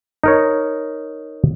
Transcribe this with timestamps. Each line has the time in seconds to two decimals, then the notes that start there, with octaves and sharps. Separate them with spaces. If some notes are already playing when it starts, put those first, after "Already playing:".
0.24 D#4 A#4 C#5